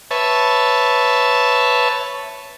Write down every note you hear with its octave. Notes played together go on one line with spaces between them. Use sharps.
B4 C#5 E5 A5